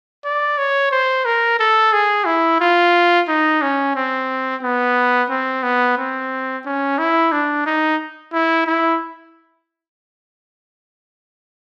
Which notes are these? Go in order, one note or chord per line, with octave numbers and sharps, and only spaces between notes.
D5
C#5
C5
A#4
A4
G#4
E4
F4
D#4
C#4
C4
B3
C4
B3
C4
C#4
E4
D4
D#4
E4
E4